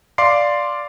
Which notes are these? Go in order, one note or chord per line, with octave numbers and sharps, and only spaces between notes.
D5 F5 C6 D6 C7